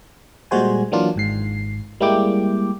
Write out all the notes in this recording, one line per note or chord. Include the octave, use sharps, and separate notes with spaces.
A#2 G3 G#3 F#4 C5 G#5
E3 F#3 A#3 D4 F4
G#1 G#2 C7
G3 G#3 A#3 E4 G5 D6